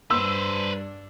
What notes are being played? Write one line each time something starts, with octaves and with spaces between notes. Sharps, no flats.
G2 D4 B4 C5 E6